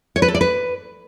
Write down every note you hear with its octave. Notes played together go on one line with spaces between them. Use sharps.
C#5
B4
A4
D5
B4